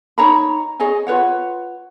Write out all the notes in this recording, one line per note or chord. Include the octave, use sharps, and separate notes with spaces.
D#4 C#5 A#5 B5
G#4 C#5 D#5 G#5
F4 B4 C#5 F#5